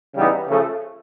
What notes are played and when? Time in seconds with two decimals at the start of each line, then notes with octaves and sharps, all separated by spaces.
0.15 C#3 E3 G3 B3 D#4
0.49 C#3 F3 A3